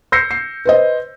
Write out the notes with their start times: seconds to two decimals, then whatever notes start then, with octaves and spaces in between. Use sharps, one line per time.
0.12 E6 G6 A#6 C7 C#7
0.31 C7
0.65 B4 C5 D#5